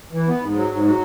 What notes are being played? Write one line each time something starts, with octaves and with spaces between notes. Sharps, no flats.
E3
B3
G#2
F#3
G#2
F#3